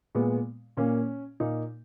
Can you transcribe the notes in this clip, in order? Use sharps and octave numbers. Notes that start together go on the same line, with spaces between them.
A#2 G#3 B3
A#2 A#3 C#4
A#2 A#3 D#4